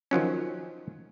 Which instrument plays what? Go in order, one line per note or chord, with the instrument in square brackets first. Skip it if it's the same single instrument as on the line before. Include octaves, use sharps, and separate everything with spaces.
[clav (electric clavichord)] D#3 F3 F#3 C#4